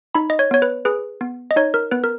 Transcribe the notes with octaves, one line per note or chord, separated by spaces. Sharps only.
D#4 B5
D#5
C#5
B3 C#5
B4
G#4 B4
B3
D#5
D#4 C#5
A#4
B3 B4
A#4